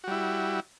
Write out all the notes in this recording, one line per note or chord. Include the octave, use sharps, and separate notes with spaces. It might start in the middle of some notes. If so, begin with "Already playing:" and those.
G3 E4 F#4